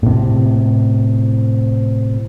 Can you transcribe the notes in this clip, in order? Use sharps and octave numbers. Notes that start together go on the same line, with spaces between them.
A2 C3